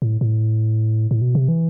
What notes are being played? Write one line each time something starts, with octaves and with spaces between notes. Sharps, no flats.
A2
A2
A2
B2
C3
E3